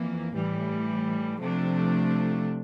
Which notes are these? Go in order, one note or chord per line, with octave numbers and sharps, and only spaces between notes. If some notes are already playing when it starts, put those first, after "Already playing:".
Already playing: F2 E3 A#3
A2 E3 G3
C3 F3 A3 D4